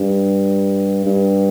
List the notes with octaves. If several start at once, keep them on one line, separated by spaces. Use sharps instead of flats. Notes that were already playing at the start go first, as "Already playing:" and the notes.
Already playing: G2
G2